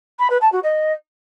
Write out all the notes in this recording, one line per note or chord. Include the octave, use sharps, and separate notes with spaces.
B5
B4
A5
F#4
D#5